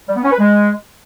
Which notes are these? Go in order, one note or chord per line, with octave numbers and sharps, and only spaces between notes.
G3
B3
C#4
B4
G#3